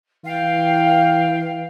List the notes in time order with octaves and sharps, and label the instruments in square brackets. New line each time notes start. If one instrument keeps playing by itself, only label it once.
[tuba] E3 [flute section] F5 G5